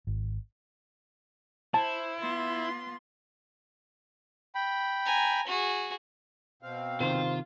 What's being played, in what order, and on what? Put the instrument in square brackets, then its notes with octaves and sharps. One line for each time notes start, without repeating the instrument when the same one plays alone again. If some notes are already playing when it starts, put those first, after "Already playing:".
[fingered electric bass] G#1
[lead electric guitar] E4 [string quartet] C5 [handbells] A5
[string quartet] B3 F4 C6
[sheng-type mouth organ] G5 B5
[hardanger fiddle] G#5 A#5
F#4 G#4
[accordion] B2 C4 F5
[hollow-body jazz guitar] C3 D#3 [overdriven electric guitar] F4 [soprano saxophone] C5